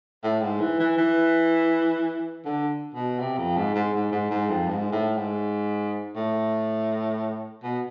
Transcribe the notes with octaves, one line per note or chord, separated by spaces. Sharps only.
A2
G#2
E3
E3
E3
D3
B2
C3
F2
G#2
G#2
G#2
G#2
G#2
F2
G#2
A2
G#2
A2
B2